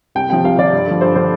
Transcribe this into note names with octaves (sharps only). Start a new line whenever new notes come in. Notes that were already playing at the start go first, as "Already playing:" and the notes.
C2 G5
C3 F3 G5
C2 F5
C3 F3 D5
G2
D3 F3
G2 C5
D3 F3 C5